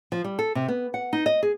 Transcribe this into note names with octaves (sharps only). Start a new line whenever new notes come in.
F3
G3
A4
C3
B3
F#5
D#4
D#5
G#4